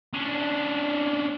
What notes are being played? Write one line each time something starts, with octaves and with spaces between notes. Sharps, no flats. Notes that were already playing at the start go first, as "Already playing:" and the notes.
C#4 D4